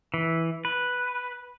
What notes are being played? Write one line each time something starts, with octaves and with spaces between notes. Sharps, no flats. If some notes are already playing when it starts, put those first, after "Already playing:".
E3
B4